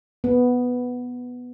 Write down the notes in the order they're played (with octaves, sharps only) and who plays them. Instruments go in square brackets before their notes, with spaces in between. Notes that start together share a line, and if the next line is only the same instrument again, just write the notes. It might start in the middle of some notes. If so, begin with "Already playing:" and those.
[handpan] B3